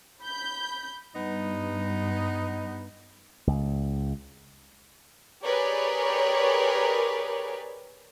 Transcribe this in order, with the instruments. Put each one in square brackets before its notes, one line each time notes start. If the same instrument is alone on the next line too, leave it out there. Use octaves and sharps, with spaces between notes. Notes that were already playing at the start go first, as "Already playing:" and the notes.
[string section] B5 G6
[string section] G2 [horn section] B3 D#4
[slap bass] C#2
[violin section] G4 G#4 A#4 B4 C#5 D5